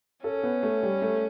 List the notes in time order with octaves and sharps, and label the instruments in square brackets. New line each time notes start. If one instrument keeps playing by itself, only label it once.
[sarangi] C#4 [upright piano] A4
[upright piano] B3
A3
G3
A3